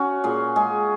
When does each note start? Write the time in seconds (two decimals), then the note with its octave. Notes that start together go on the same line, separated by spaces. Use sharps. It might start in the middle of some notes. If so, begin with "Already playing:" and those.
Already playing: C#4 F#4 F#5
0.24 A#2 G#4
0.56 G#3 G#4